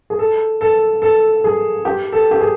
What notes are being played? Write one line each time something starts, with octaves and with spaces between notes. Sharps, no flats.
G#4
A4
A4
A4
G#4
G4
A4
G4
G#4